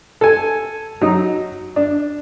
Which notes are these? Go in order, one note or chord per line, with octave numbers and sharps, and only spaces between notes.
A4 G#5
F#3 D#4
D4